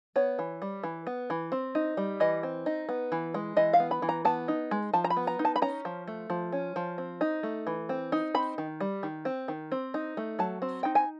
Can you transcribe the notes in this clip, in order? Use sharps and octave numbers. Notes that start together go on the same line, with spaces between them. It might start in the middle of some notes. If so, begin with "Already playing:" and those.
B3 C#5
E3
G3
E3
B3
E3
C4
D#4
G3
E3 D#5
C4
D#4
B3
E3
G#3
E3 D#5
F5
B3
B5
E3
A#5
B3 A5
D#4
G#3
F3 A5
A#5
B5
B3
A#5
D#4
A5
B5
C#4 A#5
F3
A3
F3
C#4
F3
C4
D#4
A3
E3
C4
D#4
C4 B5
D#3
G3
D#3
C4
D#3
C4
D#4
A3
F#3 A5
C4
D#4 G5
G#5